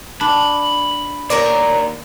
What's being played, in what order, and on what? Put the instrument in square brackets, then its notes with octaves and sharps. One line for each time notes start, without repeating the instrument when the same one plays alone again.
[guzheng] D4 [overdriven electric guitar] B5
[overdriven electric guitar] D#2 [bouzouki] A#4 C#5 D5